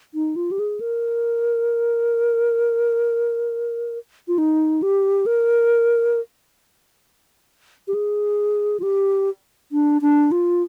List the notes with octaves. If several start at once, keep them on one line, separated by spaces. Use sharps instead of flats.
D#4
F4
G4
G#4
A#4
F4
D#4
G4
A#4
G4
G#4
F4
G4
D4
D4
F4